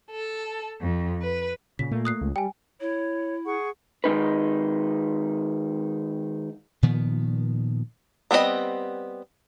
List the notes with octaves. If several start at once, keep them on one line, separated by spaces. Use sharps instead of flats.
A4
F2
B4
A#2 C#3 B6
A#2 A3 A#3
D#6 F#6 C7
C#2
G3 G5 G#5
E4 C#5
G#4 F#5 C#6
D#3 G#3 D#4 B4
A#2 D#3 F3 B3
G3 B3 C4 D#4 D#5